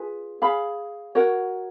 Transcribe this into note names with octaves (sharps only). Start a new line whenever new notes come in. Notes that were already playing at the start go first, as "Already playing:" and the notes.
Already playing: F4 G#4 B4
G#4 C#5 F5 B5
F#4 A#4 C#5 F#5